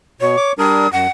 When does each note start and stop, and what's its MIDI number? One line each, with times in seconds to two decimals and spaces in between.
0.21 0.36 47
0.21 0.53 73
0.37 0.52 86
0.59 0.87 55
0.59 0.87 62
0.59 0.87 70
0.59 0.92 87
0.93 1.07 42
0.93 1.10 78